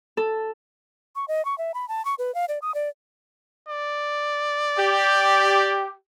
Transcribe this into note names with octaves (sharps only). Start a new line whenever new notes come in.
A4
C#6
D#5
C#6
E5
B5
A5
C#6
B4
F5
D5
D#6
D5
D5
G4